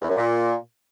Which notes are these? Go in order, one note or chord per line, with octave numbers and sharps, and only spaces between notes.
E2
F#2
A#2